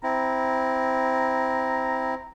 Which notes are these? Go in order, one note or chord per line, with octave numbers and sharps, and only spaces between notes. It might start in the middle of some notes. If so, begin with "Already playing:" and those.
C4 E4 A#5